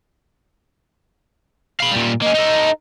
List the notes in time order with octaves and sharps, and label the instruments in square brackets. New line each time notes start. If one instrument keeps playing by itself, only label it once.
[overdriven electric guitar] F5 B5
A#2 G3
[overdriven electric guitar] A#3 C#4 [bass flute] D#5
[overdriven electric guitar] D#4 A4